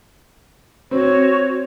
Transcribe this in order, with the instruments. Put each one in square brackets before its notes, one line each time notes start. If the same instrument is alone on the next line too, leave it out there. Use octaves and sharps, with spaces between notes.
[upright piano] C4 [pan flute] F#4 [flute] C#5